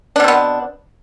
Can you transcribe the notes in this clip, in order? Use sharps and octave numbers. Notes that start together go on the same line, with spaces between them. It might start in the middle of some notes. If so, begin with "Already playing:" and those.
B2 B3 C4 D4